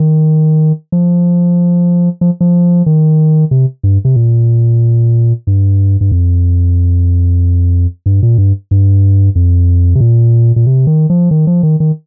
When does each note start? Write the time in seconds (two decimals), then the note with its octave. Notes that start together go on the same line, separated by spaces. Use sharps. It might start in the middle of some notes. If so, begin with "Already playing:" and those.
Already playing: D#3
0.92 F3
2.21 F3
2.41 F3
2.86 D#3
3.51 C3
3.83 G2
4.05 C3
4.16 A#2
5.47 G2
6.01 G2
6.11 F2
8.06 G2
8.23 A#2
8.38 G2
8.71 G2
9.35 F2
9.95 C3
10.00 A#2
10.56 A#2
10.66 C3
10.87 D#3
11.10 F3
11.31 D#3
11.47 F3
11.63 D#3
11.80 D#3